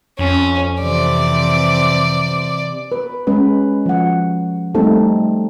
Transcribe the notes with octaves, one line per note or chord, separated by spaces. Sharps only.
F2 C#4
C3 E3 C4 D5
B4
G#3 C#4 B4
F3 F#5
G3 A3 C4 D#4 A4